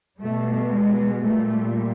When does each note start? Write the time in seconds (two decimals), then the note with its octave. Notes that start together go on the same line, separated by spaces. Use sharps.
0.20 B2 G3 A3
0.72 G#3
1.23 G3 A3
1.28 A#2